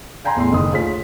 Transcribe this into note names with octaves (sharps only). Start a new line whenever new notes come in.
F5 G5 G#5 A#5 C6
E2 A2 E4 C6
F#1 D#3 D#6
D2 F4 G#4 C#5 B6